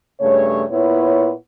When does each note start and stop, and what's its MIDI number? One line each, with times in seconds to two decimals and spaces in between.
0.21 0.63 43
0.21 0.63 49
0.21 0.63 57
0.21 0.63 73
0.70 1.33 46
0.70 1.33 59
0.70 1.33 64
0.70 1.33 73